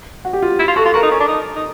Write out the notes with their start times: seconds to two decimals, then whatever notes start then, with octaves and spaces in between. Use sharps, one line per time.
0.25 F#4
0.33 G4
0.42 F4
0.59 E4
0.68 F4
0.76 F#4 A4
0.85 F4
0.94 F#4 A#4
1.03 D#4
1.12 C#4
1.20 D4
1.28 D#4
1.56 D#4